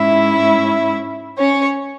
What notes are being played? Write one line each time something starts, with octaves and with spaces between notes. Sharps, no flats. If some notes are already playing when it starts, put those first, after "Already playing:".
Already playing: G#2 G#3 C#4 E4 E5
C#4 C#5